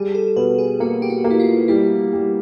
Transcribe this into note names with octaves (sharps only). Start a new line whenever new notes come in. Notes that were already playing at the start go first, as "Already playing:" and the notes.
Already playing: G3 G#4
A4
B2 B4
G#4
A#3 F#4
G4
F#4
A#3
E4
F4
G3 E4
G3